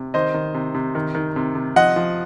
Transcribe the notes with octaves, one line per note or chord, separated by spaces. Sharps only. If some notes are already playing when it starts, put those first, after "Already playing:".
Already playing: C3
D#3 C5 D#5
D#3
C3
C3
D#3
D#3
C3
C3
F3 D#5 F#5
F3